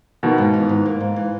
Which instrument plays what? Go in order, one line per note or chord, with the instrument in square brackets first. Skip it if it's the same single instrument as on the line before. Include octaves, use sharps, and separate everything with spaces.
[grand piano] B2 D#3 [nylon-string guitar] A#3
[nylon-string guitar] G#2
E3
G#2
A#3
G#2
E3